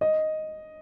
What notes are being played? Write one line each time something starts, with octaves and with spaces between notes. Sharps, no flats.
D#5